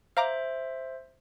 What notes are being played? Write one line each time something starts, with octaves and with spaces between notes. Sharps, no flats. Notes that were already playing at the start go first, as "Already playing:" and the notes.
C5 E5 F5 A#5 D6